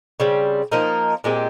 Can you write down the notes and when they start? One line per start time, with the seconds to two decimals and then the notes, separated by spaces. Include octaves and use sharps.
0.20 C#3 G3 C4
0.72 F3 A#3 D#4 A#4
1.24 A#2 G#3 C4 G4